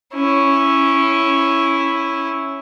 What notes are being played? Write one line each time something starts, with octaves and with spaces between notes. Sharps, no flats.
C#4 E4